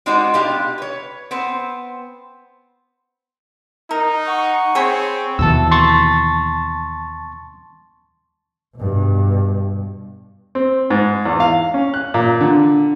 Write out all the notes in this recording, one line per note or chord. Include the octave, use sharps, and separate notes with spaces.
G3 G#3 D#4 F#4 C5 D5
B2 D4 F4 G4 F5
B4 C#5
B3 C4 C5
D#4 A#4
F#5 C#6
C4 G#4 C#5 G5 B5
D#2 B2 E3 A5 E6
A5 C6 C#6 A6
G2 B2
C4
G#2
E2
F5
C#4
F#6
A#2
D3